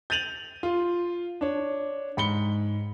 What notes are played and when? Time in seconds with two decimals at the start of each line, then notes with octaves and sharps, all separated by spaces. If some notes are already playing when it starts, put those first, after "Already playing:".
0.10 G6 A6 D#7 F7 F#7
0.63 F4
1.41 D4 C#5
2.17 G#2 B5 C#7 G7